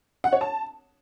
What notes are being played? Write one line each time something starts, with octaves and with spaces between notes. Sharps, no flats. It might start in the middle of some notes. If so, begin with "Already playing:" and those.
F#5
C#5
A5